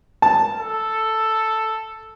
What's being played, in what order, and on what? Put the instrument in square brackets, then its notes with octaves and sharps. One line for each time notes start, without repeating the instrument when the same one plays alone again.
[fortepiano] A5
[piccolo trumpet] A4